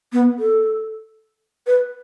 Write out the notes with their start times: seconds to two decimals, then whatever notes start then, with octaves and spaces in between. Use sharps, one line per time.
0.13 B3
0.39 A4
1.67 B4